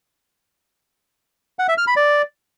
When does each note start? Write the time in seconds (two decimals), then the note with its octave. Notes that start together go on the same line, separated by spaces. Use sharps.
1.59 F#5
1.68 E5
1.78 F6
1.87 B5
1.96 D5